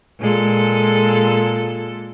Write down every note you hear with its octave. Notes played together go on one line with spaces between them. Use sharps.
A#2 G#3 A4